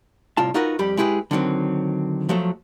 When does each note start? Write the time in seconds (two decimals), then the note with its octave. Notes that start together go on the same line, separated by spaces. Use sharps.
0.37 C2 A2 F4 A5
0.54 D#4 F4 F#4 A#4 B4
0.79 F2 G3 G4 B5
0.97 G#3 E4 G4 G#4 B4
1.31 D3 D#3 F#3 C4
2.29 F3 F#3 A3